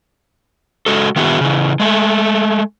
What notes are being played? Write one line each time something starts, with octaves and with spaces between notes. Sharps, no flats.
G#3 F#4 A4
D#3 B3 E4 F#4 G#4
C#3 E3
G#3 A3